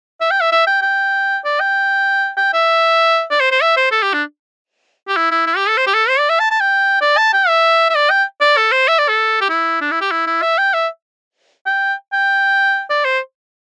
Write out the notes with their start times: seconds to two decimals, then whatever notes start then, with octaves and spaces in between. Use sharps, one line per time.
0.21 E5
0.31 G5
0.41 E5
0.52 E5
0.67 G5
0.82 G5
1.45 D5
1.60 G5
2.37 G5
2.53 E5
3.31 D5
3.41 C5
3.52 C5
3.62 E5
3.77 C5
3.92 A4
4.03 G4
4.14 D4
5.08 G4
5.17 E4
5.31 E4
5.47 E4
5.57 G4
5.68 A4
5.78 C5
5.87 G4
5.94 A4
6.09 C5
6.20 D5
6.30 E5
6.40 A5
6.51 A5
6.61 G5
7.01 D5
7.18 A5
7.33 G5
7.48 E5
7.90 E5
7.95 D5
8.10 G5
8.41 D5
8.57 A4
8.72 C5
8.88 E5
8.99 D5
9.09 A4
9.41 G4
9.49 E4
9.81 D4
9.91 E4
10.01 G4
10.11 E4
10.27 E4
10.42 E5
10.58 G5
10.74 E5
11.66 G5
12.13 G5
12.90 D5
13.05 C5